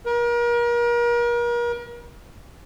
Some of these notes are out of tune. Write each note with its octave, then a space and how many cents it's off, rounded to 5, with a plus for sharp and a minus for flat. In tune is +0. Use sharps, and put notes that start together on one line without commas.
A#4 +35